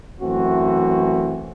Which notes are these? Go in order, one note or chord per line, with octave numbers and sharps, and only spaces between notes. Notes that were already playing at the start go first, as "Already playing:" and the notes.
F#2 E3 A3 C4 F#4